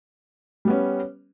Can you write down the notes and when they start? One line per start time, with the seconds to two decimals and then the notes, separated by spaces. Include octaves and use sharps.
0.65 G3
0.68 B3
0.70 C#4